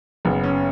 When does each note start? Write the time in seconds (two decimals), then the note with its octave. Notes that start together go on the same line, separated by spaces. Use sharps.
0.25 F#1 B3
0.44 C#4